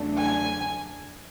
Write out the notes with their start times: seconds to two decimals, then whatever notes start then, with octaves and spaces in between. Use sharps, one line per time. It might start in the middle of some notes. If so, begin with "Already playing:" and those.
Already playing: E2 C#3 F#3 A3 D4
0.18 G#5